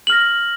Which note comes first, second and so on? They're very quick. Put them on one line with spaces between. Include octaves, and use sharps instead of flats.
F#7 F6 A#6